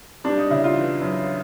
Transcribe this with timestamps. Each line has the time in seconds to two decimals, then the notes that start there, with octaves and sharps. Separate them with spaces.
0.24 G3 D4
0.37 D#4
0.50 C#3 E4
0.64 F4
0.76 E3
1.02 F#2